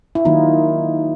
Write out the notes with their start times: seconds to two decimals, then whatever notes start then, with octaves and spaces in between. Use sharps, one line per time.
0.15 E4
0.25 D#3 F#3 A#3 D#4 F4